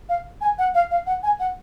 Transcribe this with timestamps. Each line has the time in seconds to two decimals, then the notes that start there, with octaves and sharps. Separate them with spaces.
0.09 F5
0.41 G#5
0.58 F#5
0.74 F5
0.91 F5
1.06 F#5
1.23 G#5
1.40 F#5